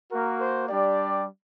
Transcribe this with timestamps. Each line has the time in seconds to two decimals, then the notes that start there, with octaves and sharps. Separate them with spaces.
0.12 A#3 F#4 A#4
0.41 C5
0.69 G3 D4 G4 D5